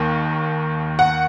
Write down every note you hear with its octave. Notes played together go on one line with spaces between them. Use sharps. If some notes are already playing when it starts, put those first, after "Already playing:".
Already playing: D#2 D#3
F#5